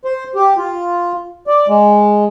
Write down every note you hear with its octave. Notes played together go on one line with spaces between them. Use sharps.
C5
G4
F4
D5
G#3